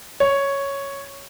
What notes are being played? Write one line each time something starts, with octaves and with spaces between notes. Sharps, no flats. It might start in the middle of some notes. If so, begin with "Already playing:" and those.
C#5